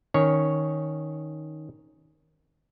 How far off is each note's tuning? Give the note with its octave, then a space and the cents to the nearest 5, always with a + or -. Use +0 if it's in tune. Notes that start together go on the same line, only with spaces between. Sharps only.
D#3 +0 C#4 +0 C#5 +0